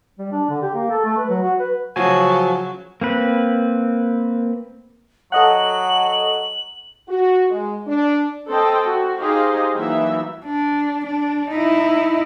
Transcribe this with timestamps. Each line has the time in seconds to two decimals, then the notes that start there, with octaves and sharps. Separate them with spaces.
0.19 G3
0.32 D4
0.50 D3
0.62 G4
0.75 A#3
0.90 A4
1.05 A3
1.17 B4
1.29 F#3
1.42 F#4
1.60 B4
1.96 C#3 F3 F#3 F#4 G#5
3.01 A#3 C4 B4
5.32 F#3 A4 D#5 F#5 F#7
7.08 F#4
7.50 G#3
7.87 D4
8.49 C4 A4 C5 D#5 G5 A5
8.87 F#4
9.19 D#4 G4 G#4 C5 D#5 F5
9.75 E3 F#3 A#3 D#4 E4 E5
10.46 D4
11.06 D4
11.51 D#4 E4